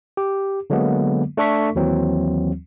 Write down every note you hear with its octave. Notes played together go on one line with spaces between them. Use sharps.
G4
D3 F#3 G#3 A#3 B3
A3 D4 A4 C#6 B6
D#2 E3 F#3 C4